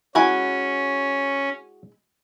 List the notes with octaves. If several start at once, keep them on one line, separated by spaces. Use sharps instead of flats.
G#3 C#4 E4 F#4 G#5